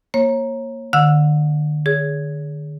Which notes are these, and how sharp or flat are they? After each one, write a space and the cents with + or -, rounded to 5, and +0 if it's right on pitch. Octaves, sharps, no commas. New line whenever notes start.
A#3 +0 C#5 -30
D3 +45 F#5 -35 E6 +5
G#4 +0 C#5 +35